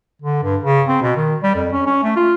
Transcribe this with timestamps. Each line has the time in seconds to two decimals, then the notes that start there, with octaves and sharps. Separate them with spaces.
0.22 D3
0.43 G2
0.64 C#3
0.88 C4
1.02 B2
1.16 D#3
1.42 G3
1.55 F2
1.72 C#4
1.86 C#4
2.03 A3
2.16 F4